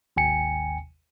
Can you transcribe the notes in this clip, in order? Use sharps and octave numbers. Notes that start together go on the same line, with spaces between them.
G#1 D#2 G5 G#5 C#7